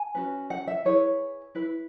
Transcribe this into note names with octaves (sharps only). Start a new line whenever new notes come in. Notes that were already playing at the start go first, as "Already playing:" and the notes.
Already playing: G#5
C#4 F#4 B4
F#5
E5
E4 G#4 B4 C#5
E4 B4